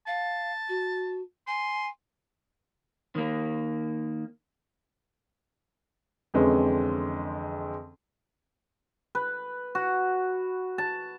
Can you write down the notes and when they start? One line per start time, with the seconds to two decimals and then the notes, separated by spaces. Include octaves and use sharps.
0.07 F5 A5
0.69 F#4
1.47 G#5 C6
3.15 D#3 A#3
6.34 F2 D3 E3 G#3 C4 C#4
9.15 B4
9.75 F#4
10.78 A5